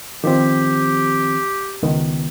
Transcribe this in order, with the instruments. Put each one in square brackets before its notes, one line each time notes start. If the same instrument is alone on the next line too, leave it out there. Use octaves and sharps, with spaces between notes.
[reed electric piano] D#3 F3 C4 [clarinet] G4
[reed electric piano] C#2 D#3 B3